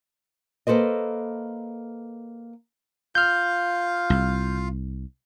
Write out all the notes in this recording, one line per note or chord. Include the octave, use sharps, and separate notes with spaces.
A#3 A4 B4 C5 D#5
F4 F5 F6 G6
C2